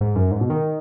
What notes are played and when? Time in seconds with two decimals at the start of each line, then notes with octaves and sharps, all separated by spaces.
0.01 G#2
0.15 F#2
0.31 G#2
0.41 B2
0.50 D#3